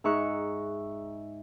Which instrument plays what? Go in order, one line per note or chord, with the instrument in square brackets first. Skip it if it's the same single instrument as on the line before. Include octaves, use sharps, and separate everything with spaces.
[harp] G#2 D#4 E5 C#6 F#6